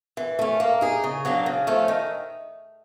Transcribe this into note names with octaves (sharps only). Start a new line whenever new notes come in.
E3
A3 C#4
A#3
D#4 G#4
C#3
F#3 A#3 D4
C#3
F3 A3 C#4
D#3